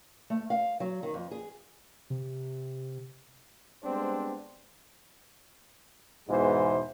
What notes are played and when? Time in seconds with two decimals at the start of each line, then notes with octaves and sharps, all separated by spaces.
0.30 A3
0.50 F5
0.80 F#3
1.03 D#3
1.14 F2
1.31 G#4
2.10 C3
3.84 G3 G#3 B3 C4 D4 C5
6.29 E2 G#2 B2 E3 G#3 C5